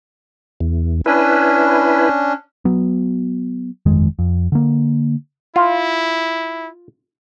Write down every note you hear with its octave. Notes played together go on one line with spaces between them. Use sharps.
E2
C#4 D4 E4 B4
F#3 B3
G1 F2 D#3 G#3
F2
D3 A#3
E4 F4